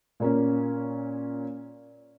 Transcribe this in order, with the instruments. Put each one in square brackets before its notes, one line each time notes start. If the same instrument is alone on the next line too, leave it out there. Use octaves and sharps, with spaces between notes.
[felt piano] A#2 A#3 C#4